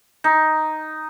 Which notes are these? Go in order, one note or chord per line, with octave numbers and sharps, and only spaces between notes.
D#4